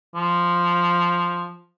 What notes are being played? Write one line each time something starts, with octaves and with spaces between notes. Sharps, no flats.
F3